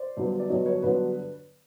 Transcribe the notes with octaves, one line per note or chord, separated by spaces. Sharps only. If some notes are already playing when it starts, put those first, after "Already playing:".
Already playing: C5 D5
G2 D3 F#3 B3
D5
G2 D3 F#3 B3 C#5 D#5
B4 C#5
G2 D3 F#3 B3 B4 C#5